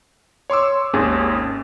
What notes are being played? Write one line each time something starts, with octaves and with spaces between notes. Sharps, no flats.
C#5 C6 D6 E6
G#1 D#2 C#4 G#4